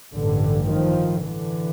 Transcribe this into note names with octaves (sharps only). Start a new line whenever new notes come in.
A1 G2 D3
D#3 F3
D3 E3